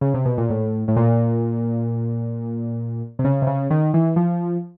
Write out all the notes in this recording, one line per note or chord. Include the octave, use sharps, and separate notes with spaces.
C#3
C3
B2
A#2
A2
A2
A#2
C3
C#3
C3
C#3
D#3
E3
F3